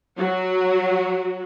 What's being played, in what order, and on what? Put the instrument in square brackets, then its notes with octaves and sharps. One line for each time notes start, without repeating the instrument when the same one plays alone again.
[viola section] F#3 F#4